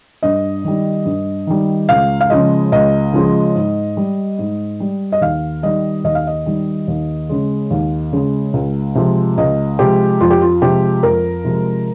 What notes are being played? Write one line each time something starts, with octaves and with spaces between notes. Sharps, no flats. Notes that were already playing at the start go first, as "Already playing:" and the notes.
G2 D#5
D#3 G3
G2
D#3 G3
C#2 F5
F5
C#3 F3 G#3 D#5
C#2 D#5
C#3 F3 G#3
G#2
G3
G#2
G3
D#5
D#2 F5
D#3 G3 D#5
D#2 D#5
F5
D#5
D#3 G3
D#2
C#3 G#3
D#2
C#3 G#3
C#2
C3 F3 G#3
C#2 D#5
C3 F3 G#3 G4
F2 F4
G4
F4
C3 F3 G#3 G4
F2 A#4
C3 F3 G#3